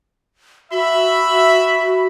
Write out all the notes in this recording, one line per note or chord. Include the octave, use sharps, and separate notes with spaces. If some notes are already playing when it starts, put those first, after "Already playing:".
F#4 E5 B5